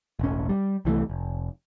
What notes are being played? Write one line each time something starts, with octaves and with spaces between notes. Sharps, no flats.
E1 A1 C#4
G3
C2 E3 F3 A3
F1